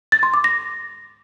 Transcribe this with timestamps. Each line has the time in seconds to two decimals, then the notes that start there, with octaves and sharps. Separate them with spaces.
0.12 A6
0.23 C6
0.34 D6
0.44 A#6